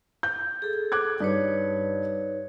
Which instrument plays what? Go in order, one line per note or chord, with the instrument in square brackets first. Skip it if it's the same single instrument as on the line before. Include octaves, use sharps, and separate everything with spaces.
[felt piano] G6
[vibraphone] G#4 A4
[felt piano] D6 F#6 G#6
[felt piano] G2 [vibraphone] D#4 B4 C#5